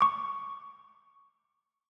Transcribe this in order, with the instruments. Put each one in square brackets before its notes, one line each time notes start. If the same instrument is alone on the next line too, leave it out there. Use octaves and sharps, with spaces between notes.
[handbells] C#6 D6